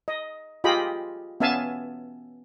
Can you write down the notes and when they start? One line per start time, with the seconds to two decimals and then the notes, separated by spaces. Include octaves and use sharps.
0.08 D#5
0.64 F4 G4 G#4 D#5 G5 B5
1.40 B3 C#4 E5 F5 G#5 A5